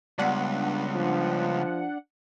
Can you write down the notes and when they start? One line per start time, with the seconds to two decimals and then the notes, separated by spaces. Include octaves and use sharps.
0.19 C#2 G3 B3 D4 F#5
0.95 F3